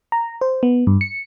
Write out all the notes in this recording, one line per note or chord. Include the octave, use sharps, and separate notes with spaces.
A#5
C5
B3
G2
C#7